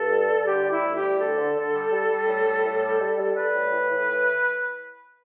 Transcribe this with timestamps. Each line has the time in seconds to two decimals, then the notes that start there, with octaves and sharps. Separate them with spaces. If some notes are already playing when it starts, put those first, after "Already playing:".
Already playing: G2 A4
0.11 G3
0.29 G3
0.47 D3 G4
0.65 G3
0.71 E4
0.82 D2
0.96 G4
1.02 G3
1.19 D2 A4
1.37 D3
1.56 D3
1.73 G3
1.92 G3
2.09 G3
2.27 A2
2.45 G3
2.65 A2
2.82 G3
3.00 G3
3.18 G3
3.36 G3 B4
3.54 A2
3.72 E3
3.91 A2
4.09 E3